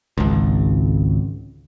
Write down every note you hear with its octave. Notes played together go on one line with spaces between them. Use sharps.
G#1 C#2